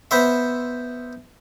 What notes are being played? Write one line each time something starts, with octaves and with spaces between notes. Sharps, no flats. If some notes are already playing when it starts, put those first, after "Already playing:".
B3 C5 E5